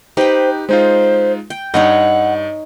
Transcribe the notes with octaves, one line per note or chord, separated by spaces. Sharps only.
D#4 G4 B4 C5 G5
G#3 D#4 F4 C5
G5
G2 D#4 C#5 D#5 F#5